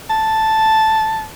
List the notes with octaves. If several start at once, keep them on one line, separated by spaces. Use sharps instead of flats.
A5